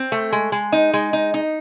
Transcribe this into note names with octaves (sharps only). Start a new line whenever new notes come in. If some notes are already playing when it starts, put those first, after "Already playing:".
Already playing: C4
A3
G#3
G#3
D#4
G#3
D#4
D#4